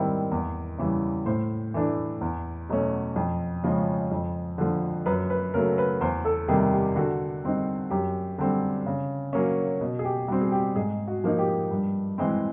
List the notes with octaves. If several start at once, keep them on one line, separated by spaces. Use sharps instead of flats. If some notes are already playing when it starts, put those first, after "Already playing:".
Already playing: G#2 D#3 G3 C4 E4
E2
C#3 E3 G3
A2 C5
E3 A3 D4
E2
B2 F#3 A3 C#4
F2
C#3 F3 G#3 C#4
F2
D3 F3
F#2 B4
B4
C#3 F#3 A3 A#4
B4
E2 C5
A4
C3 D#3 G3 G#4
G4
D3 F#4
G3 C4 D#4
F#2 G4
D3 G3 C4
C#3
F#3 A#3 C#4
B2
G#4
G4
G3 C4 F#4
G#4
G4
G#2 G#4
F#4
F3 A#3 D#4
G4
G2
E3 G#3 C4